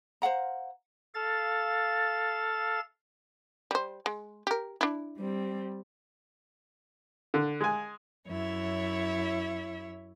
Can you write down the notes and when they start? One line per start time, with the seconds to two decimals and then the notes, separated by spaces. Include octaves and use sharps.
0.22 C5 F5 F#5 A#5
1.14 A4 F5 A6
3.71 G3 C5
4.06 G#3
4.47 G4 A#4
4.81 D4 E4
5.18 G3 C4
7.34 D3
7.61 G#3 G#5
8.27 F#2 E4 C#5 E5